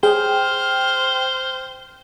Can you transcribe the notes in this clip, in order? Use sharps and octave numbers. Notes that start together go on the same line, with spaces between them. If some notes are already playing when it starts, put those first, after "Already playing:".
G#4 C5 G5 F6